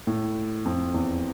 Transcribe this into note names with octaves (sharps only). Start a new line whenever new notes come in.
A2
F2
E2